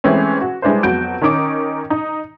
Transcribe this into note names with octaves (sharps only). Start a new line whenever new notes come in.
E3 G#3 A3 C4 C#4
F#4
G3 G#3 D4 E4 B4 C5
F2 F#3 B3 F#4 G6 D7
D#3 C#4 D#4 D6
D#4